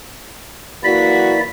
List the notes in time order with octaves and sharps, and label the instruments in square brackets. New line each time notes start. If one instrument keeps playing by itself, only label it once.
[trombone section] E3 A#3 [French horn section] F#3 G#3 F#4 [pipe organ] E4 D5 [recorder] B6